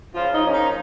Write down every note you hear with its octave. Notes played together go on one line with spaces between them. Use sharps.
C#3 F3 F4
D#4
F3 A#3 C#4
D#4